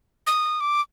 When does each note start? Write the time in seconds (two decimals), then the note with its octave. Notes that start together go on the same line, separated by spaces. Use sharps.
0.27 D#6
0.60 D6